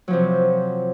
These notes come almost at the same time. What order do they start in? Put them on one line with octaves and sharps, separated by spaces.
F#3 F3 C3